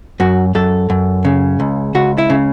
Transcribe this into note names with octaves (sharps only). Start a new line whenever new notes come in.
F#2 F#4
F#2 A4
F#2
C#3
C#2
C#2 F#4
E4
C#3